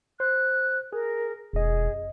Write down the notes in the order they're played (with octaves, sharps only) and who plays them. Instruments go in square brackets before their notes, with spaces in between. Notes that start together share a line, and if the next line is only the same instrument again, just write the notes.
[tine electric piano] C5 [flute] F#6
[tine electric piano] G#4 [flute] A#4
[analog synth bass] E1 [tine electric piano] F2 D#5 [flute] G#4